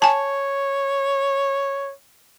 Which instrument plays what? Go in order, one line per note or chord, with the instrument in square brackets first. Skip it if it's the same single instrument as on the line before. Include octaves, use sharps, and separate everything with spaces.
[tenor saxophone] C#5 [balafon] G#5 A5